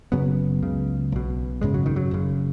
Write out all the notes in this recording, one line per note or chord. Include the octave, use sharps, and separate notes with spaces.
F#1 F#2 C#3 F#3 B3
C#2 C#3
B1 B2
G#1 F#2 C#3 G#3
F#3
D#3
F#3
F#1 F#2 C#3